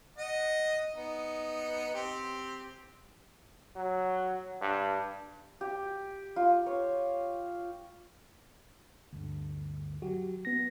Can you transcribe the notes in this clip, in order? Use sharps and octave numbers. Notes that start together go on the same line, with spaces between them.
D#5 F#5
B3 D#4
C4 G4
F#3
G2
G4
F4
C#5
D2 G2 D3
F#3 F#4 G4
B3 A#6